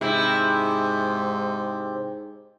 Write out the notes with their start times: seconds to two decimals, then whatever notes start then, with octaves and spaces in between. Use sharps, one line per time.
0.01 G#2 C3 E4